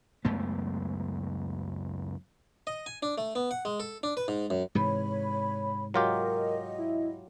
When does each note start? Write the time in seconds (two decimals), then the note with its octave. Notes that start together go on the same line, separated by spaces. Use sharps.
0.25 C#2 F#2 A3 B3
2.67 D#5
2.86 G#5
3.03 D4
3.18 A3
3.35 B3
3.51 F#5
3.65 G#3
3.80 A4
4.03 D4
4.17 B4
4.28 G#2
4.50 F#2
4.75 G#2 C3 E3 C#5 B5
5.94 F#3 F4 G4 A#4 D#5
6.78 E4